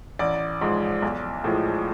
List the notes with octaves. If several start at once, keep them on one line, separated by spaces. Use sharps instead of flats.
A1 D5
G#2 F3 G#3
B1
A2 F3 G#3